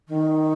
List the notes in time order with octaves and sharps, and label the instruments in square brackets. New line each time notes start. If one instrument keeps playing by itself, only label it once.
[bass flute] D#3